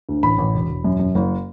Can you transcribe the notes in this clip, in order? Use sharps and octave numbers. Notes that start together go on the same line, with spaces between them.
D2
A1 B5
A1
E1
E1
F#2
F#2
F#1